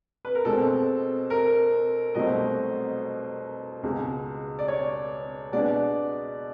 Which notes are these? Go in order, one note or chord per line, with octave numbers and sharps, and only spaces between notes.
B4
A#4
B2 G#3 C4 A4
A#4
C2 B2 F#3 A3 C4 D#5
C#2 B2 G#3
D5
C#5
B2 G#3 B3 D4 D5